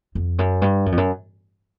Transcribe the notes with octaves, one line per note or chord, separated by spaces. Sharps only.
F2
F#2
G2
F#2
F2
F#2